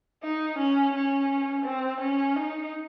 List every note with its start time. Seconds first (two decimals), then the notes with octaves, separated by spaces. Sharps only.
0.23 D#4
0.59 C#4
0.94 C#4
1.65 C4
2.01 C#4
2.36 D#4